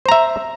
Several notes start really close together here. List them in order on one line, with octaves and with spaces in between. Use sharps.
C5 A#5 E5